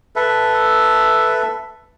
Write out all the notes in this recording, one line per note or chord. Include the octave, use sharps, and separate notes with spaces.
A4 B4 E5